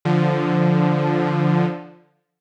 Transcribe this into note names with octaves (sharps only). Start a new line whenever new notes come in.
D3 F3